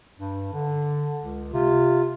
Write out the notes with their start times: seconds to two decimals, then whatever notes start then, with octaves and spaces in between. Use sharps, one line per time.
0.20 G2
0.53 D3
1.21 C#2
1.53 C3 F4